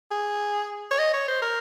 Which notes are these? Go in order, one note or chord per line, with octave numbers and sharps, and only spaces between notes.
G#4
C#5
D#5
C#5
C5
A#4